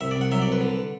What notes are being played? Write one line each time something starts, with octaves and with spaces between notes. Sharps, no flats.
C2 E5
D5
C2
F#5
F#3 E5
D5
C2
B4
D3